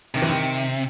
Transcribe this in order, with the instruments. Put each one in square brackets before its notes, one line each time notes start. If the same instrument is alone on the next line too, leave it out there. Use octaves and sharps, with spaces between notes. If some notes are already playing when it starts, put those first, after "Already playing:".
[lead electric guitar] C3 [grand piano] D#3
[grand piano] E3
D#3